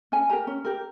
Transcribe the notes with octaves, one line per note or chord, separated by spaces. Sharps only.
C#4 G#5
G4 A#4 A#5
C#4
G4 A#4